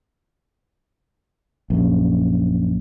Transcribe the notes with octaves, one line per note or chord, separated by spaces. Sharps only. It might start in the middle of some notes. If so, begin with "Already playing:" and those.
A#1 F#2